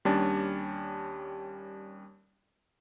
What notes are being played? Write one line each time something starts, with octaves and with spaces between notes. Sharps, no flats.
D#2 G3 C#4 D4 A5